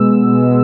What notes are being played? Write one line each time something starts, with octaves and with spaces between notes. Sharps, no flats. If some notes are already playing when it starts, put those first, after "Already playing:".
Already playing: B2 G#3 B3 E6
B2 G#3 B3